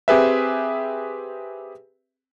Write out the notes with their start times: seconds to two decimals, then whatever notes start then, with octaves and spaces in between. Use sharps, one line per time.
0.08 C4 G4 G#4 B4 E5